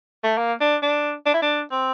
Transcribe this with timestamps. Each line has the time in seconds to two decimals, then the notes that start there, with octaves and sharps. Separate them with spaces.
0.24 A3
0.38 A#3
0.61 D4
0.83 D4
1.26 D4
1.34 E4
1.42 D4
1.72 C4